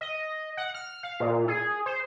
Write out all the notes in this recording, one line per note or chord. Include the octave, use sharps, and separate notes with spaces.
D#5
F#5
F6
F5
A#2
G#4
C5